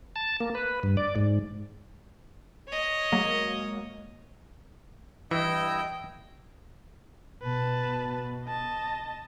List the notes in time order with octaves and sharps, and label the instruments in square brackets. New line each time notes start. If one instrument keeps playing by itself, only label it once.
[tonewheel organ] A5
A#3
B4
G2
D5
G#2
[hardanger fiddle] C#5 D#5
[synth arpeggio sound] F#3 G#3 A#3
[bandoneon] G2 E4 E6 [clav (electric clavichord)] E3 [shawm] D#5 [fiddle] G5
[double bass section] B2 [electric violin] B4 A5
[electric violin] D#5 A5